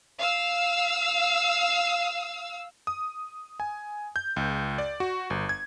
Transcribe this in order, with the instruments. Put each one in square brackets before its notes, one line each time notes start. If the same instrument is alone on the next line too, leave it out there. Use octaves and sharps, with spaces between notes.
[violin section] F5 E6
[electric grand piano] D#6
G#5
G6
C#2
D5
F#4
G1
G#6